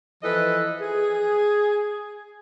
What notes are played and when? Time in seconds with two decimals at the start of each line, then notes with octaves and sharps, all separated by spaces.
0.23 E3 F3 A4 B4 D#5
0.81 G#4